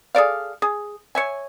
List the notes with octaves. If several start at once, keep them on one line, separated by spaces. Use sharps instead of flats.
G#4 A4 D5 F5
G#4
C#5 E5 G#5